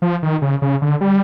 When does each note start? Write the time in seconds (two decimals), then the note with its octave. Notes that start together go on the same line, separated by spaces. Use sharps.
0.02 F3
0.23 D#3
0.42 C#3
0.62 C#3
0.82 D3
1.01 G3